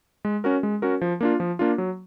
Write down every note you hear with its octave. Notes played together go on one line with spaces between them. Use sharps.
G#3
C#4 F#4 A#4
G#3
C#4 F#4 A#4
F3
A#3 D4 F4
F3
A#3 D4 F4
F#3